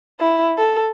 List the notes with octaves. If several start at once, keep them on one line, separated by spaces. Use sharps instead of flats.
E4
A4